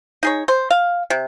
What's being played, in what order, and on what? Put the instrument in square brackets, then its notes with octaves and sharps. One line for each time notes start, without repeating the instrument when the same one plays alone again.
[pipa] D#4 G#4 C#5
C5
F5
C3